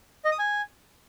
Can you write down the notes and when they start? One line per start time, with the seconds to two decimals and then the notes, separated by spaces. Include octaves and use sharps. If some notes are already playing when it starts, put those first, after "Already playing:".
0.25 D#5
0.32 D#6
0.39 G#5